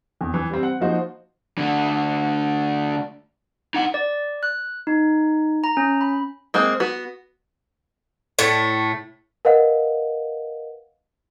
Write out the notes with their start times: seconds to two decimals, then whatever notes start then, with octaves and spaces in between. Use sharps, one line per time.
0.21 E2
0.34 E3
0.50 G3 C4
0.63 F#5
0.80 F3 A#3 D#4 F#4 C5
1.58 D3 A3
3.74 D#4 F#5
3.94 D5
4.43 F#6
4.87 D#4
5.64 A#5
5.77 C#4
6.01 B5
6.54 G#3 A#3 C4
6.80 B3 F#4
8.39 A2 A3
9.45 A#4 B4 D#5 F5 F#5